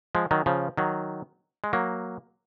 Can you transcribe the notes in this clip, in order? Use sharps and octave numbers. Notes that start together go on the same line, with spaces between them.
F3 G#3
D#3 F#3
C#3 F3
D#3 F#3
G#3
F#3 A#3